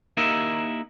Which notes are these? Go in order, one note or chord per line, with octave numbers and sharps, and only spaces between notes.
A#3 D#4 E4 G4 A#4 E5